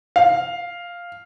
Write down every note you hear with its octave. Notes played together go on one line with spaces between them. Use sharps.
F5